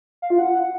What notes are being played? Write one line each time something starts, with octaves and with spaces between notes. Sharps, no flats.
F5
F4
F#5